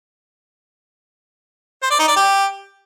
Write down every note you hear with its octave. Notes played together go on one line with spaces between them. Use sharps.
C5
D5
D#4
D5
G4